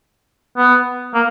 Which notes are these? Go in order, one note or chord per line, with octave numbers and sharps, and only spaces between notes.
B3
A#3